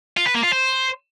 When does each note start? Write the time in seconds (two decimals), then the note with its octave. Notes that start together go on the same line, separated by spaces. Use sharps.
0.17 F4
0.26 B4
0.35 A#3
0.43 F4
0.52 C5